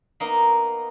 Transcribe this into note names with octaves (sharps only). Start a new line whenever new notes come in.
A#3 B3 D#4